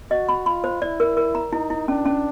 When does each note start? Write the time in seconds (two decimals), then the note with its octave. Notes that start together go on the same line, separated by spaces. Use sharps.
0.11 F#4 D#5
0.29 B5
0.46 F4 B5
0.64 C5
0.82 E4 D5
1.00 A#4
1.17 A#4
1.35 A#5
1.53 D#4 E4
1.70 E4
1.88 C#4 D4
2.06 C#4